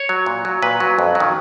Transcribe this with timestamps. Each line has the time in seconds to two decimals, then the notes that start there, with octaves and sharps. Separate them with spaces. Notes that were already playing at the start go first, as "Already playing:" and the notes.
Already playing: C#5
0.09 F#3
0.26 A#2
0.45 F#3
0.62 A#2 B4
0.80 F#3
0.99 F2
1.15 F#3
1.20 D#3